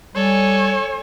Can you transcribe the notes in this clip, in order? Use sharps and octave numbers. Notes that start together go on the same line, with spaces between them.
G3 A4 C#5 G#5